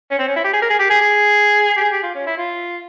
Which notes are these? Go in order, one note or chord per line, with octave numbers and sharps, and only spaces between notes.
C#4
C4
C#4
E4
G4
G#4
A#4
G#4
G4
G#4
G#4
G4
G#4
G4
F4
C#4
E4
F4